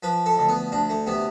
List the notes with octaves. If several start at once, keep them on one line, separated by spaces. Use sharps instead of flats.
F3 B4
A4
D2
B3
D2 D4
A3
C3 B3